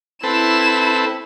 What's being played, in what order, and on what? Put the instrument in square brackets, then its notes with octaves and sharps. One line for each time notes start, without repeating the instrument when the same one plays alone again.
[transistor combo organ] C4 A4 B4 [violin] E4 E7